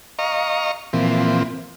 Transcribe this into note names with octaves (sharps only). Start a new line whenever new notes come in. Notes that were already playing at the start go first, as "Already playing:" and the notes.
D#5 F5 A#5 C#6
A#2 E3 F3 C4